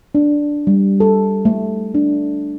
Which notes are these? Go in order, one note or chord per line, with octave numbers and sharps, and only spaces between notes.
D4
G3
A4
A3
D4